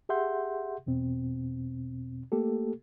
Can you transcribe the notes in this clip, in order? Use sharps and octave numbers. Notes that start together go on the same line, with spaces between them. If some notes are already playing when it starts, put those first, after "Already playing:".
G4 G#4 E5 F#5 C6 G6
E2 B2 C4
A3 A#3 G4 A4